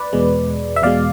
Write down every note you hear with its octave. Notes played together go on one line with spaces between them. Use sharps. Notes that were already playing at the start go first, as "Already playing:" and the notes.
Already playing: B4 D5
E2 B2 G#3
E5
E2 B2 G#3 D5 F5